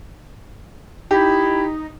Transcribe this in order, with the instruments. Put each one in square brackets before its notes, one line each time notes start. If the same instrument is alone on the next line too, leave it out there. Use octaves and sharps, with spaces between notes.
[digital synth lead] D#4 [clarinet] E4 [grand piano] G4